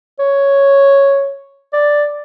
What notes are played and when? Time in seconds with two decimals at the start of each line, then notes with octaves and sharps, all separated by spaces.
0.19 C#5
1.73 D5